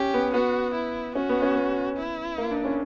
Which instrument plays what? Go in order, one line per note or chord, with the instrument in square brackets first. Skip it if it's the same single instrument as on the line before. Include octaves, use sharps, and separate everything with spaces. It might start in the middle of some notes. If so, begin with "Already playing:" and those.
Already playing: [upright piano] C#4 [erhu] G4
[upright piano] B3
[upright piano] B3 [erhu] F#4
[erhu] E4
[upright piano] C#4 [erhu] F#4
[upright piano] B3
C#4
B3
[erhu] E4
[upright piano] A#3
D4
C#4